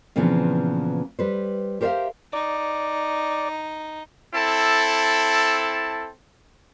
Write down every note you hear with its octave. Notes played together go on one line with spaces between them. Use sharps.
A#2 C#3 E3 F3 B3 C4
G3 B4 C5
G4 A#4 C5 D5 E5 F5
D#4 D5
C4 E4 A4 A5